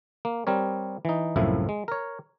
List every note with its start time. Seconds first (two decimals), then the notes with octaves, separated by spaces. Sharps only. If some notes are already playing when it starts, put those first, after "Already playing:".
0.25 A#3
0.47 G3 C4 A#4 C#5
1.05 E3 D#4
1.36 C2 F#2 A2 F3 E4
1.69 G#3
1.88 A#4 C#5